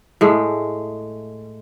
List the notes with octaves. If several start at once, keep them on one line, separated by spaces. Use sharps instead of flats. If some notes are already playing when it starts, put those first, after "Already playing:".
A2 G#3 A3